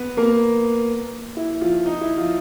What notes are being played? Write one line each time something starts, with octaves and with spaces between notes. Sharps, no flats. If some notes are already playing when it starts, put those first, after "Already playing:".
Already playing: B3 B4
A#3 A#4
E4
F3 F4
D#4
E4
F3 F4